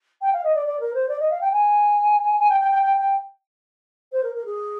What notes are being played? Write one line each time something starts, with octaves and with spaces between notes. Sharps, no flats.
G5
F5
D#5
D5
D5
A#4
C5
D5
D#5
F5
G5
G#5
G#5
G5
G5
G5
G5
G5
C5
A#4
A#4
G#4